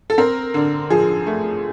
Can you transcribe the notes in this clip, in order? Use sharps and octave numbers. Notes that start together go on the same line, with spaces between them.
A4
C4 A#4
D3
F3 G#4
A3